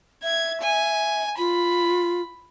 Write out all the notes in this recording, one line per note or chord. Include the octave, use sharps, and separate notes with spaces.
E5 G#6
G#5
F4 B5